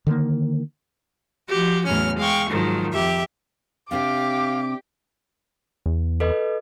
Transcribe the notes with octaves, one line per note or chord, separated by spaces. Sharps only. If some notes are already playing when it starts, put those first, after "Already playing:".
D3 D#3 G#3 A#3
F3 F#4 G4
E2 A2 F#3 C#4 F6
G#3 F5 G5 C#6
G#2 D#3 F3 F#3
F2 G4 E5
C3 C4 D4 G4 F5 D6
E2
A4 B4 D#5